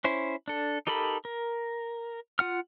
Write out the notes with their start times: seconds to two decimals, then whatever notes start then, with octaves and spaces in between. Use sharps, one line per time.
0.04 C#4 E4 C5
0.48 D4 A4
0.87 D#4 G4 A4 A#4 B5
1.25 A#4
2.39 F4 F#5 F6